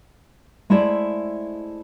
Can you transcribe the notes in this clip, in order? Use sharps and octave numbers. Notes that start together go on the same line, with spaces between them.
G#3 A3 E4 C5 D5